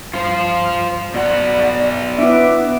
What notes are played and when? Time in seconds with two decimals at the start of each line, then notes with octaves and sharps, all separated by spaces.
0.14 G2 F4 C5
1.14 B2 F#3 D5 F#5
2.19 B3 D4 E4 E5 D6